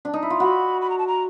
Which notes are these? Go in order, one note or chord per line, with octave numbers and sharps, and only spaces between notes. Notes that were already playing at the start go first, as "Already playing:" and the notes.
D4
D#4
E4
F4
F#4 B5
B5
A#5
A5
A#5